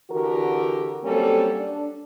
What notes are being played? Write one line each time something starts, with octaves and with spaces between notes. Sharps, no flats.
D3 E3 F#4 G4 A#4
F#3 G3 A#3 C4 C#4 A4
D4